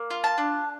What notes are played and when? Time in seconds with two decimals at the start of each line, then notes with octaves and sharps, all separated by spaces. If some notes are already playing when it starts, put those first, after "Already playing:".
Already playing: A#3
0.10 F4
0.24 A5
0.38 D4